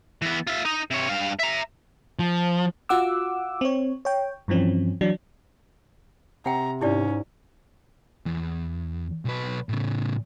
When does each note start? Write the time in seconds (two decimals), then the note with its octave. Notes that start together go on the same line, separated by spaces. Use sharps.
0.22 E3 B3
0.47 F4 E5
0.65 D#4 D#5
0.91 C3 C#5
1.09 G2 F5
1.40 E5 A#5
2.19 F3
2.89 F4 F#4 F#5 D6 E6
3.61 C4 C#5
4.05 C#5 G5
4.48 G2 E3 F3 C4 C#4
5.01 E3 F#3 D4
6.46 C3 F#5 G5 A#5
6.82 G#2 C#4 E4 G4 D5
8.26 E2
9.25 B1 B4
9.69 A2 C#3